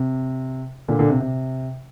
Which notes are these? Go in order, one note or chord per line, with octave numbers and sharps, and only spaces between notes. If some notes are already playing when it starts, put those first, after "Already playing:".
Already playing: C3
A#2 D3
A#2 D3
C3
C3